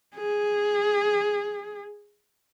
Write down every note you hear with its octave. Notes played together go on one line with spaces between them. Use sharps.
G#4